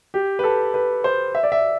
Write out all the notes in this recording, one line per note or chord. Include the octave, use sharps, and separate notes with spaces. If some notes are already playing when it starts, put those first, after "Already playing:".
G4
B4
A4
B4
C5
E5
D5
E5